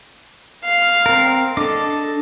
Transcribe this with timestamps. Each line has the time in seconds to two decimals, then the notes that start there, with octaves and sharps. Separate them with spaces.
0.64 F5
1.06 C4 A#4
1.57 D4 A4 D#5 D6